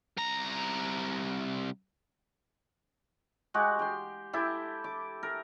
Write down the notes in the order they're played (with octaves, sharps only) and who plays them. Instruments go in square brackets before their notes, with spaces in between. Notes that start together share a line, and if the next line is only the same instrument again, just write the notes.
[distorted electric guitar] C2 A#5
[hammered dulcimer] G#3 F#4 G4
G4 C6
E4 G4 A4
D6
A#4